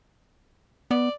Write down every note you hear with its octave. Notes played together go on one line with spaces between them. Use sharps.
B3 D5